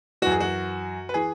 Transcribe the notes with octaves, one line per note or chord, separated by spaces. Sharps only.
F#2 E3 F#4
G#4
F#4
B4
E3 G#4